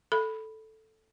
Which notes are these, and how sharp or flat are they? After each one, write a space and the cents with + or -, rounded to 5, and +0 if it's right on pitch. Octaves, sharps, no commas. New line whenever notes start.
A4 +0 B5 +0